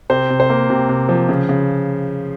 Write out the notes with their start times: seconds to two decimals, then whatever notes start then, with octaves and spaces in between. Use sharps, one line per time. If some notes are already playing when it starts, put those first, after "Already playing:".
0.10 C3 C5
0.30 C3
0.40 C5
0.50 A#3
0.70 C3
0.89 C3
1.09 F3
1.29 C#3
1.49 C#3